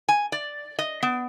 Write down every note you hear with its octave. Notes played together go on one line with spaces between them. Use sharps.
G#5
D5
D#5
B3